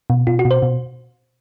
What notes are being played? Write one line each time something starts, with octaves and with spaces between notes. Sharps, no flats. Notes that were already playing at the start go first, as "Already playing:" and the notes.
B2
B2 F4
F#4
B2
C5
B2